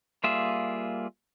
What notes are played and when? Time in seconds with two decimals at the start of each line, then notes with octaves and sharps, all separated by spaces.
0.24 G3 A#3 F4 G#4 E5